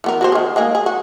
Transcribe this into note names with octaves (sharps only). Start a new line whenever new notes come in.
E3 B3 A#4
F#4 B4 C5
D#3 G#4
G#3 A#3 G#4
G#4
F#4